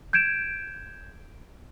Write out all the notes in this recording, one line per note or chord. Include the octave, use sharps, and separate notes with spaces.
G6 G#6 D7 E7